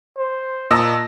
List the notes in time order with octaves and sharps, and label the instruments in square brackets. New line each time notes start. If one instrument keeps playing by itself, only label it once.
[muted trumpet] C5
[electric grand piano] A#2 E6 A#6 [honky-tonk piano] D#5 A5 A#5